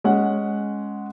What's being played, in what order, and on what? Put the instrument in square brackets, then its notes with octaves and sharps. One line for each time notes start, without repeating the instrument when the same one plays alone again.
[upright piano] G#3 C#4 F#5